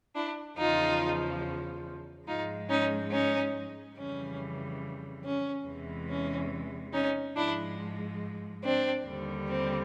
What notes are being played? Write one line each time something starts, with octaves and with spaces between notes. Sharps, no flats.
D4 E4
E2 C#3 F3 D#4 F4
G#2 F3 G#3 D#4 F4
C#4 D#4
C#4 D#4
F2 C#3 E3 G3 C#4
C#4
E2 C3 E3 G#3
C#4
C#4 D#4
G#2 F3 G#3 D4 E4
C4 D4
D#2 D3 G3
C4